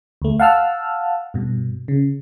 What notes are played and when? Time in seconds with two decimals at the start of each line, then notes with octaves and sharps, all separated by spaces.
0.22 D2 A3
0.39 F5 F#5 A5 E6 F6
1.34 G2 B2
1.88 C#3